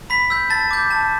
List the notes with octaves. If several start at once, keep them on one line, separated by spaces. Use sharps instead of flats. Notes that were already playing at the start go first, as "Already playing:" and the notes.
B5 B6
E6 G6
A5 A6
D6 G6
A5